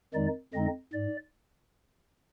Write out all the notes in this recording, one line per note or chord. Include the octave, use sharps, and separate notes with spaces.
F2 D#3 G#3 D#4 D5
F2 D3 G#3 C4 D#4 D#5
G#2 D5